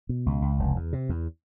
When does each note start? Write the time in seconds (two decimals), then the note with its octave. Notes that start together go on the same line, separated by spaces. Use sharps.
0.09 B2
0.26 C#2
0.42 C#2
0.59 F1
0.76 E2
0.93 C3
1.09 E2